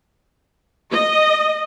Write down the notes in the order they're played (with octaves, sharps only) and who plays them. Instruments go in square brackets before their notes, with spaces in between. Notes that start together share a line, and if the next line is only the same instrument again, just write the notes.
[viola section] D#5